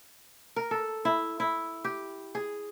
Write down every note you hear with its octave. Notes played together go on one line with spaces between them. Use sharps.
A#4
A4
E4
E4
G4
G#4